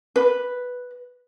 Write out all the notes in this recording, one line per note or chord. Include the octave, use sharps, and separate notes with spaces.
B4